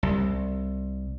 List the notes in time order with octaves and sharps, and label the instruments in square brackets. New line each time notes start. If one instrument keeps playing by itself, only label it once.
[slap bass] C2